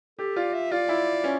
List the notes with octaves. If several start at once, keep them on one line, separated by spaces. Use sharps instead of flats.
G4 A4
F4 D5
E5
F4 D5
E4
C#4